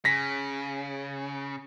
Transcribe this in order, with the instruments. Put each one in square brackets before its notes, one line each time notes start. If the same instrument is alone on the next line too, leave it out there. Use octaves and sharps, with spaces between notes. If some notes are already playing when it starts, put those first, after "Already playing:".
[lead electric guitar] C#3 [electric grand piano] A#6 B6